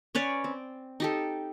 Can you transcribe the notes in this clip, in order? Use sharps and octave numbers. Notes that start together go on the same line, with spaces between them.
C#4 B4 C#5 D5
C4
D#4 G4 A4